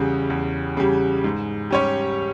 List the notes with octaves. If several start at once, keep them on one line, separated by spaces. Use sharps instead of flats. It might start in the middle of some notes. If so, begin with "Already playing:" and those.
Already playing: E2 C#3 G3
E2
C#3 G3
G#2
G3 C#4 G4 C#5